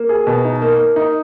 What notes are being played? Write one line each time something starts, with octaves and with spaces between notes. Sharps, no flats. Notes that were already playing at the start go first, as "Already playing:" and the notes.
Already playing: A#3
G#4
B2
D#4
A#3
A#3
D#4